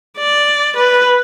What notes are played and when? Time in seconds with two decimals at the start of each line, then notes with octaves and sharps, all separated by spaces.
0.18 D5
0.76 B4